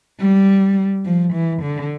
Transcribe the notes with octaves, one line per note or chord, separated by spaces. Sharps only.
G3
F3
E3
D3